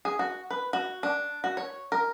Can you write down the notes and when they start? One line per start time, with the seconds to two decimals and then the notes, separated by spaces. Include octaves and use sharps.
0.05 G#4
0.19 F#4
0.50 B4
0.73 F#4
1.03 D4
1.44 F#4
1.57 C#5
1.92 A#4